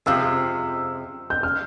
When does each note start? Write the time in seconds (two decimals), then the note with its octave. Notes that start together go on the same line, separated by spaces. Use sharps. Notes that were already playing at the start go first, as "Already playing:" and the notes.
0.06 F2 C3 F3 G#3 E6
1.30 G6
1.43 F6